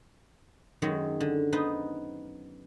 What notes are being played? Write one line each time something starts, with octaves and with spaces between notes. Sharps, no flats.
F#2 D#3 F#3 G#3 C#5
D3
B3 D#4 B4 C5